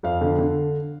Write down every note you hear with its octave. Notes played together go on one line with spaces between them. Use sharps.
F2 F5
D3
D3